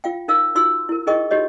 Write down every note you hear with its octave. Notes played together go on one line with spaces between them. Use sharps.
F4 F5 G5
D#4 A#4 F5 E6
D#4 F4 F#4 C6 E6
E4 A#4
D#4 G#4 A#4 D#5 G5 C#6
D#4 F#4 G4 C#5 D#5